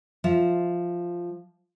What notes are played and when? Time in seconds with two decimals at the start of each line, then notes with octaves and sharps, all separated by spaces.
0.24 F3 E5